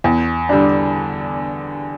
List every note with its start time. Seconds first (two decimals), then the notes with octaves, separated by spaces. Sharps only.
0.04 E2
0.49 D3 G3 D4